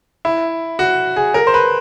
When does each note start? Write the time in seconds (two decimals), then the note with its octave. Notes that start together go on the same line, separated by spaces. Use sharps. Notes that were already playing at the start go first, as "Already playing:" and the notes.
0.25 E4
0.79 F#4
1.16 G#4
1.34 A#4
1.47 C5
1.54 B4